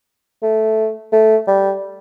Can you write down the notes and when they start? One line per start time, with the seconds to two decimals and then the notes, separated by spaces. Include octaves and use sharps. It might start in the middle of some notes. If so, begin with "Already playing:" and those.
0.43 A3
1.12 A3
1.47 G3